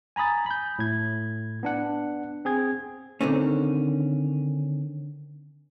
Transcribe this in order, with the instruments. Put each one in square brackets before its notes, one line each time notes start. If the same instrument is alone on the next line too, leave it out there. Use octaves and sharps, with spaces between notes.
[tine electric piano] G#5 A#5 B5 D#6 A6
B5 G6
A2 G#6
B3 D4 F#5
C4 G#4 G#6
[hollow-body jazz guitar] D3 D#3 C4 C#4